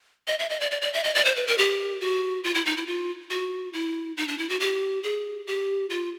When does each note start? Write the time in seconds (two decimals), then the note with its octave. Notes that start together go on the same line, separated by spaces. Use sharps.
0.27 D#5
0.39 E5
0.50 D#5
0.60 D5
0.71 D5
0.82 D5
0.93 E5
1.04 D#5
1.15 D5
1.25 C5
1.36 B4
1.47 A#4
1.58 G4
2.01 F#4
2.44 F4
2.55 E4
2.66 D#4
2.77 E4
2.87 F4
3.30 F#4
3.73 E4
4.17 D#4
4.28 D4
4.38 E4
4.49 F#4
4.60 G4
5.03 G#4
5.47 G4
5.90 F4